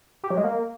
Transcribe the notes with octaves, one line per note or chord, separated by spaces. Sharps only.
G4
F#3
G#3
A#3